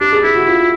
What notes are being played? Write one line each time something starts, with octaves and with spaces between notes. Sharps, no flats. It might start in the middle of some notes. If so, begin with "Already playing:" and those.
D4 G4
G#4
E4 G4
F#4
F4